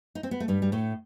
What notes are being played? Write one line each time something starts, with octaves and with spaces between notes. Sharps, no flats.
D#4
C4
B3
A3
G2 G3
G3
A2 A3